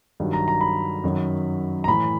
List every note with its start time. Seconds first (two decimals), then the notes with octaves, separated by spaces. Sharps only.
0.20 G2 D#3 F#3
0.33 A#5
0.48 A#5
0.61 B5
1.04 F#2 D#3 F#3
1.84 A#5
1.88 A2 E3 B5